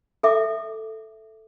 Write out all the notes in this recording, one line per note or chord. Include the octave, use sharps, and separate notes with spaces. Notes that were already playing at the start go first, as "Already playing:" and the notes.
A4 E5 D6